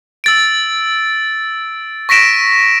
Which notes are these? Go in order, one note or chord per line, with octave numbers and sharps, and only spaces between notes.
E6 A6 D7
C#6 A#6 B6 D7 E7